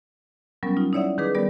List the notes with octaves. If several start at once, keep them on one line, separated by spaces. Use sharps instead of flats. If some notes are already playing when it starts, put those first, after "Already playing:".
F#3 G3 B3 C#4 A#4
D#4 F4
D#4 E4 C#5 D5 E5 F#5
D#3 D#4 G#4 B4 D6
G3 B3 G4 A#4 D5